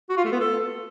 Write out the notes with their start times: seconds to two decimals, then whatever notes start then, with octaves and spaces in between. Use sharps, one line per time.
0.10 F#4
0.17 F4
0.25 A3
0.33 B3
0.40 A4